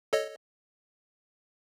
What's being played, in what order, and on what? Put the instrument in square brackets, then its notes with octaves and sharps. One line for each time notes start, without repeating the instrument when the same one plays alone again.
[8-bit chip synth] A4 C#5 D#5